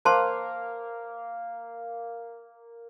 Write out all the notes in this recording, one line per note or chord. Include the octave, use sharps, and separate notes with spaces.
A#3 C5 F5 A5 A#5 C6